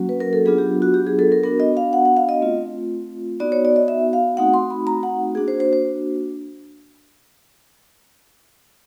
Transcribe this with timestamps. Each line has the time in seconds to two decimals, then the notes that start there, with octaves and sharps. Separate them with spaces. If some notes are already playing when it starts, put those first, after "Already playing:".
Already playing: F#3 A#3 C#4 F#4
0.09 B4
0.20 A#4
0.33 A4
0.45 F#3 B3 D4 F4 G#4
0.58 G4
0.82 F#4
0.94 G4
1.06 G#4
1.19 A4
1.32 A#4
1.44 B3 D4 F#4 A#4
1.60 D#5
1.77 F5
1.93 F#5
2.05 F#5
2.17 F5
2.29 D#5
2.41 A3 C4 F4
3.40 B3 D#4 F#4 D5
3.52 C#5
3.65 D5
3.76 D#5
3.88 E5
4.13 F5
4.37 A3 C4 D#4 F#4 F#5
4.54 C6
4.70 B5
4.87 A#5
5.03 F#5
5.35 A#3 D4 F#4 G#4
5.48 C5
5.60 C5
5.73 C5